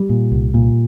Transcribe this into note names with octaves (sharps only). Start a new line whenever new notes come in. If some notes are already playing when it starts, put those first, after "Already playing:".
Already playing: G3
A#2
C2
A#2